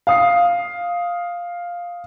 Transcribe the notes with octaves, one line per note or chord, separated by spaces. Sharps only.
F5 D#6 C7